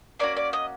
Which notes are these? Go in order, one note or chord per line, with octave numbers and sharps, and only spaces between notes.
A#3 C#4 F#4 D5
D5
D#5